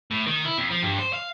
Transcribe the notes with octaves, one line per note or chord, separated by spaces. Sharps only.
A2
D#3
E4
F2
F3
G2
C5
F5